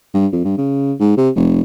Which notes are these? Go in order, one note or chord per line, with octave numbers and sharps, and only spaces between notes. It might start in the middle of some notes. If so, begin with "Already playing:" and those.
G2
F2
G2
C#3
G#2
C3
F1